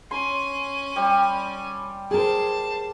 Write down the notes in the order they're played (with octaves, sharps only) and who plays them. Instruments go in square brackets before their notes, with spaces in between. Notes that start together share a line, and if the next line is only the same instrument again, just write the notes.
[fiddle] C#4 G#5 [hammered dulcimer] C6
[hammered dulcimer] G3
[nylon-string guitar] G#4 A#4 [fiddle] C5 A5